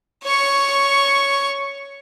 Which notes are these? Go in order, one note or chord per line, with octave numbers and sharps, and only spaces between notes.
C#5 C#6